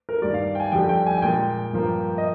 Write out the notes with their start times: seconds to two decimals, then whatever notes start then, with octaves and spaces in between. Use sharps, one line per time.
0.09 A#4
0.22 G2 D#3 G3 D5
0.34 F5
0.55 G5
0.60 G#5
0.72 F2 D3 G3 G5
0.89 G5
1.06 G#5
1.18 G#5
1.22 A#2 G#3 G5
1.73 G2 F3 A#3
2.18 D#5